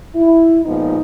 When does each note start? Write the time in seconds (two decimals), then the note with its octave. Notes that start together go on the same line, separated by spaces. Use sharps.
0.15 E4
0.65 A#2 F3 G#3 B3 D#4